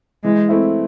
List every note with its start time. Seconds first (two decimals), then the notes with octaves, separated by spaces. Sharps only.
0.24 E3 G#3
0.49 A3 C4 E4